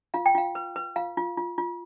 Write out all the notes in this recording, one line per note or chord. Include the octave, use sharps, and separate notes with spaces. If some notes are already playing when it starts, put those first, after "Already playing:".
F4 F5
G5
F4 F5
B4
B4
F4 F5
F4
F4
F4